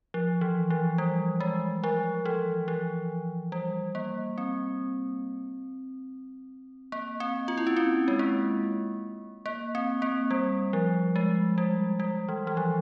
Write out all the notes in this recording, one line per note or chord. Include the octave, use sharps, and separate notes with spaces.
F3
E3
F3
G3
G#3
F3
E3
F3
G3
A#3
C4
A#3
C4
F4
E4
C#4
C4
G#3
A#3
A#3
C4
A#3
G3
F3
G#3
G3
G3
E3
E3
F3